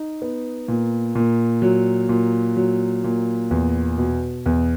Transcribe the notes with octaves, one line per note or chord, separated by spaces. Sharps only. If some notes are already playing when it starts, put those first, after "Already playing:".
Already playing: D#4
B3
A#2
A#2
F#3
A#2
F#3
A#2
E2
B2
E2